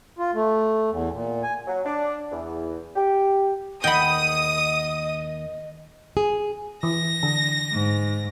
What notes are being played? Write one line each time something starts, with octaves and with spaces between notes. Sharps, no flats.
F4
A3
E2
A#2
G#5
F#3
D4
E2
G4
D#2 D#5 F#5 G5 B5 D#6
G#4
E3 A#6
D3
G#2